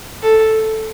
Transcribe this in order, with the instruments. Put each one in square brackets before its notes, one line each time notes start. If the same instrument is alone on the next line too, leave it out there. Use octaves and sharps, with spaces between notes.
[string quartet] A4